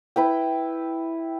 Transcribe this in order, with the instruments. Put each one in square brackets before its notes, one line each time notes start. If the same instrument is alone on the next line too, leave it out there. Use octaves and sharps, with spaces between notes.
[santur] E4 B4 G5